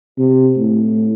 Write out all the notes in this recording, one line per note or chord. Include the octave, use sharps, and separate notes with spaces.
C3
A2